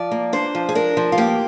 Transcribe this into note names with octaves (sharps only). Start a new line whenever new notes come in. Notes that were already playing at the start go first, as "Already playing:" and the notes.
Already playing: F3 D5
A#3
D4 C5
F3
G#4
D4 A#4
F3
F4
A#3 G4